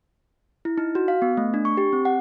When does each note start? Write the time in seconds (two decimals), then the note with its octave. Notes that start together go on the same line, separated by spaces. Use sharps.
0.65 E4
0.78 D#4
0.95 F#4
1.08 F5
1.22 B3
1.37 A3
1.54 D4
1.65 C#6
1.77 G4
1.93 C4
2.05 F#5